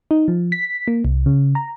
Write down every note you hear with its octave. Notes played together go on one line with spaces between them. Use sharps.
D#4
F3
B6
A#3
C2
C#3
A#5